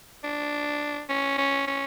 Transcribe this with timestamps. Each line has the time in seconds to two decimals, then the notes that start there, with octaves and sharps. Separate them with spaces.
0.24 D4
1.09 C#4
1.38 C#4
1.67 C#4